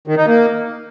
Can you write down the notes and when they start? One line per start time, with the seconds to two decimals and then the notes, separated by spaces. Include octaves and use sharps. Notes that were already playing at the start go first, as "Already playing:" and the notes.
0.08 D#3
0.17 D#4
0.27 A#3